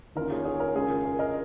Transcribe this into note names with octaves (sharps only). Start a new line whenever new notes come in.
D#3 A#3 C#4 F4 A#4
G#4 C#5
G#4 C#5
A#4
C#3 G#3 C#4 F4 G#4
A#4
A#4
A#4 D#5